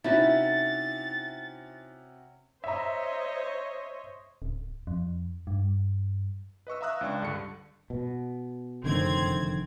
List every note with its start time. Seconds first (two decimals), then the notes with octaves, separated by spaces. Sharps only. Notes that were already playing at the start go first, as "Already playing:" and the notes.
0.04 C3 C#4 D#4 E4 F#4 E5 A6
2.64 C5 C#5 D#5 E5 A#5
4.42 D1
4.87 F2
5.47 G2
6.67 B4 D#5 C#6 E6
6.81 E5 F5 A#5 D#6 E6 F#6
7.01 C#2 D4 D5 C#6
7.22 G2 D3 C#7
7.90 B2
8.84 F1 F#2 D3 D#3 C4 G#6